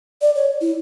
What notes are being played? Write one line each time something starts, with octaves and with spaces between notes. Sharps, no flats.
D5
C#5
E4